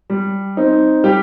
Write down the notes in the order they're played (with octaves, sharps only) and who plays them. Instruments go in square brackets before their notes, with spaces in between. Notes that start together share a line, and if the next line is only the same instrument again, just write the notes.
[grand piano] G3
C4 D#4
G3 G4